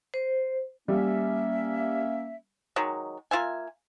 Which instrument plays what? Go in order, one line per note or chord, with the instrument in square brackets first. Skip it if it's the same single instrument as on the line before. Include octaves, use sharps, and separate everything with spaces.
[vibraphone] C5
[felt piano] G3 [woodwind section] A#3 C#4 E5
[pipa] D#3 F#3 G#3
A#3 F4 E5 G#5